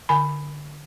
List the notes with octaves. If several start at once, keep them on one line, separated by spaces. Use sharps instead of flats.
D3 G#5 B5